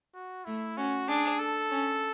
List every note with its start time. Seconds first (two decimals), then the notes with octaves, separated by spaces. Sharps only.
0.14 F#4
0.45 A3 E4
0.77 C#4 F#4
1.08 D4 G#4
1.39 A4
1.70 C#4